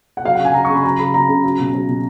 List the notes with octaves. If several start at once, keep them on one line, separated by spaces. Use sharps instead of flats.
F#5
F#3 F5
F#5
C#3
G#5
F#3 A#5
C#6
C#3 B5
F#3 A#5
C#3 B5
F#3 A#5
C#3
F#3
B2
F#3
B2